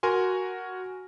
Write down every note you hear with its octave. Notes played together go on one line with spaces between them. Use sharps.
F#4 A#4 G#5 C6